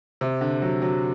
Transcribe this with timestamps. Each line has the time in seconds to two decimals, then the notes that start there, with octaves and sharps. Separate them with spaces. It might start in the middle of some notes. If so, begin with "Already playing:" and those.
0.21 C3
0.41 D3
0.62 F#3
0.82 F#3